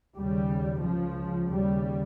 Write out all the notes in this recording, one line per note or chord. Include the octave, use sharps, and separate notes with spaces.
D#2 C#3 G3
C#2 C#3 F3
D#2 C#3 G3